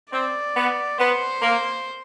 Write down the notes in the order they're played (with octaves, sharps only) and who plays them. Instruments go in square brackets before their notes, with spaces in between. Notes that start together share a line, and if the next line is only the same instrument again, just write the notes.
[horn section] C4 [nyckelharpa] D5
[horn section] B3
[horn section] B3 [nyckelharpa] C5
[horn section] A#3